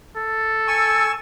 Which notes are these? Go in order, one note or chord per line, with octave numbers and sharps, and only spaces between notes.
A4
G#5 C#6 E6